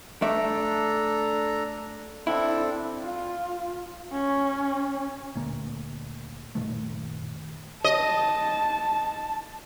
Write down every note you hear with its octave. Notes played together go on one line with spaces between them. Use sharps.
A3 D4 A4 D5 E5 A#5
C4 D4 E4 A4
F4
C#4
D2 A#2 A#3
F#1 A#2 D#3 A3
D#5 A5